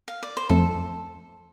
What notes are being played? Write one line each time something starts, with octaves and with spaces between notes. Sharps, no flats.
F5
D5
C5
F2 F3 A3 C4 A4